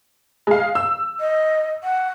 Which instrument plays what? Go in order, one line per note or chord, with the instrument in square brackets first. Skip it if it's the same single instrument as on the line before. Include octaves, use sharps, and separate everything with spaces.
[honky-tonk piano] G#3 F5
E6
[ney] D#5
F#5